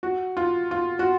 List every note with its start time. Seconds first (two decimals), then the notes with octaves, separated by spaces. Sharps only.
0.03 F#4
0.37 F4
0.71 F4
0.99 F#4